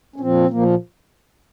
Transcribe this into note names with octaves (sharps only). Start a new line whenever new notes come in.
C#4
A#2 F3 C4
A#2 F3 A#3